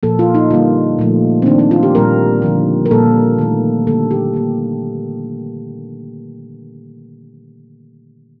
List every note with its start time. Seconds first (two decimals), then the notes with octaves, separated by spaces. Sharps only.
0.03 A#2 F3 A#3 A4
0.19 F4
0.35 D#4
0.51 D3 G3 A#3 F4
0.99 A#2 F3 A3
1.42 C4
1.46 D#3 A#3 D4
1.59 C4
1.71 F4
1.83 G4
1.95 A#2 G3 A#3 A#4
2.42 D3 F3 A#3
2.86 A#4
2.91 A#2 G3 A#3 A4
3.39 D#3 A3
3.87 D3 G3 A#3 A4
4.11 G4
4.34 D#3 A#3